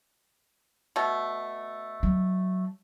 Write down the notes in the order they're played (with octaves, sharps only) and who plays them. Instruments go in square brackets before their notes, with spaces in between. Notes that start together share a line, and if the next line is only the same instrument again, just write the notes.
[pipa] B2 A3
[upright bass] F#3